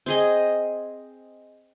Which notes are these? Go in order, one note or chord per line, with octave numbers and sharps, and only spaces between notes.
C4 G#4 D#5